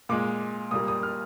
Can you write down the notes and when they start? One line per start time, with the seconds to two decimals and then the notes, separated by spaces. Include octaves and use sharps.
0.09 A#2 G#3 D6
0.71 A#2 G3 A#3 D#6
0.88 D#6
1.03 F6